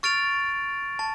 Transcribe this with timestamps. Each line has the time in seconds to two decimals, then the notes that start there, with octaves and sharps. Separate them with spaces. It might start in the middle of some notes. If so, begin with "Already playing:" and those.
0.03 C#6 F6 A6 D7 F7
0.99 A5